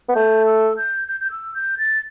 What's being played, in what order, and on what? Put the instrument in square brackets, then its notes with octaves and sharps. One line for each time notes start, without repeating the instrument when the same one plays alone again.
[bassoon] B3
[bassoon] A3 [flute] G6
[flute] E6
G6
G6
G6
E6
G6
A6